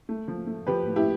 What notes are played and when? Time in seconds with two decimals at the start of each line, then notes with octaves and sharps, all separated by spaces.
0.09 A3
0.28 F3
0.47 A3
0.67 F3 G4 B4
0.86 A2
0.96 E4 G4